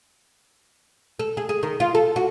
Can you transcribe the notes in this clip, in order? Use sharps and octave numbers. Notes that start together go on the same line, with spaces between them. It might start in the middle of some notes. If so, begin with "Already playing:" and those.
A4
G#4
G#4
D#3
F4
A4
F#4